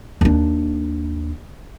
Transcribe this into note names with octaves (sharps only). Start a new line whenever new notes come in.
D#2 D4